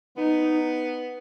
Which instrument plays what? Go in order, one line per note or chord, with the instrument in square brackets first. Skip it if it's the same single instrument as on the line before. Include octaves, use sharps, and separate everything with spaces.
[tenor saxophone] B3 [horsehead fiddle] D#4